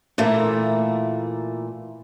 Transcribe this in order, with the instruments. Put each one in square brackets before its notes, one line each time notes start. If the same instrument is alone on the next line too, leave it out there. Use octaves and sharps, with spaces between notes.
[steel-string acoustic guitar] A#2 E3 A3 A#3